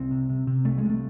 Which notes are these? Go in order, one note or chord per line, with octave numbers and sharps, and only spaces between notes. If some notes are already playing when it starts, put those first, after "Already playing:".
Already playing: C2 C4
C3
C3
C3
C2 A3
G#3
C3
A3